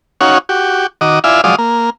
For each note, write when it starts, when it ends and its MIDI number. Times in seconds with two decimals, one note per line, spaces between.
0.21 0.38 61
0.21 0.38 63
0.21 0.38 66
0.21 0.38 73
0.21 0.38 77
0.21 0.38 78
0.49 0.87 66
0.49 0.87 67
1.01 1.19 51
1.01 1.19 66
1.01 1.19 75
1.01 1.19 86
1.24 1.41 64
1.24 1.41 65
1.24 1.41 74
1.24 1.41 76
1.24 1.41 77
1.24 1.41 80
1.44 1.56 53
1.44 1.56 54
1.44 1.56 56
1.44 1.56 74
1.44 1.56 77
1.44 1.56 87
1.58 1.90 58